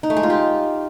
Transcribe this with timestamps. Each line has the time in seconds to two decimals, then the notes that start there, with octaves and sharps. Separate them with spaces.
0.03 D#4
0.10 A3
0.17 G#3
0.23 F4
0.30 G4